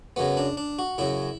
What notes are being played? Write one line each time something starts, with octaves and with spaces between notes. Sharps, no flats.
F#2 C#3 F#3 B3
D4
D4
F#4
F#2 C#3 F#3 E4